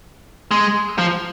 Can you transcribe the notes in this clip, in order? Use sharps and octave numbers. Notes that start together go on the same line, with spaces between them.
G#3
F3